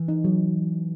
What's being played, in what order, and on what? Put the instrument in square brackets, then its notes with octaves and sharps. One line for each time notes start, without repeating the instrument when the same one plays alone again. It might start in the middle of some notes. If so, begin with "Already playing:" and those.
Already playing: [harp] E3
[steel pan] D#4
F#3